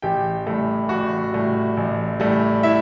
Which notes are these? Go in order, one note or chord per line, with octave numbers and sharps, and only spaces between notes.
A1 G4 G5
A2 G3
A1 F#4 F#5
A2 G3
A1
A2 G3
E4 E5